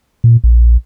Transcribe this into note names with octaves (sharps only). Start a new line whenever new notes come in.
A#2
A#1